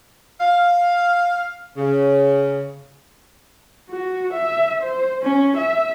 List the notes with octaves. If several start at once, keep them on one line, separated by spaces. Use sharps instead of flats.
F5
C#3
F#4
E5
C5
C#4
E5